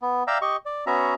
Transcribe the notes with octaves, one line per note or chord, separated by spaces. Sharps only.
B3
D5 E5 F5 G5 A#5 E6
G4 D#5 C#6
D5
B3 C#4 F#4 E5 A#5